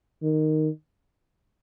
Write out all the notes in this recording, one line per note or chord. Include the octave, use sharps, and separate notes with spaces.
D#3